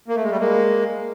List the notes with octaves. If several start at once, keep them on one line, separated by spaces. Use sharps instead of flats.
A#3
A3
G#3
G3 A3
G#3 A#3